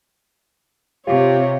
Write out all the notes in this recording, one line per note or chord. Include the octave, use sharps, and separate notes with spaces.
C3 F4 G4 C#5